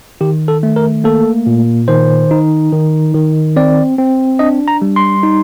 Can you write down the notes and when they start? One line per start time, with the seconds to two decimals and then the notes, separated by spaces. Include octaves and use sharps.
0.21 D#3 G4
0.48 A4
0.63 A3
0.76 A#4
1.04 A#3 A4
1.46 A#2
1.88 D#3 C5
2.31 D#4
2.72 D#3
3.14 D#3
3.56 C4 D5
3.98 C4
4.39 D4 D#5
4.68 A#5
4.82 G3
4.96 C6
5.23 D#4